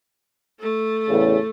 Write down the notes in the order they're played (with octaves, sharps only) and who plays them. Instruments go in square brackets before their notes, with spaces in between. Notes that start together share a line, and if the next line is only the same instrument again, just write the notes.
[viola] A3 A4
[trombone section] E2 A2 C#3